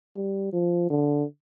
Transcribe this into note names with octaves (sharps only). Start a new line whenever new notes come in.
G3
F3
D3